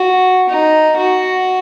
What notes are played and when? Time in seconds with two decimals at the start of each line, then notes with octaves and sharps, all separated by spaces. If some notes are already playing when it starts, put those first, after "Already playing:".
Already playing: F#4
0.49 D#4
0.97 F#4